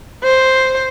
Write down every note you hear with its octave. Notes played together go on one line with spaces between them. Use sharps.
C5